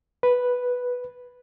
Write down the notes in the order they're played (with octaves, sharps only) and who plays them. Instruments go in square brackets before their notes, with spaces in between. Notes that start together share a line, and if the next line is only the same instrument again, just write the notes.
[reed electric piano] B4